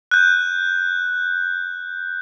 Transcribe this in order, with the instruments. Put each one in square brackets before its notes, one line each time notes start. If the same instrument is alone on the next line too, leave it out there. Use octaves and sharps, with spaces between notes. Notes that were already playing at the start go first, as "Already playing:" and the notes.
[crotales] F#6 G6